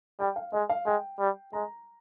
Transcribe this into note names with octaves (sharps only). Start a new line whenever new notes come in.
G3 G5
F5
G#3 D#5
F5
G#3 G5
G3
G#3 A#5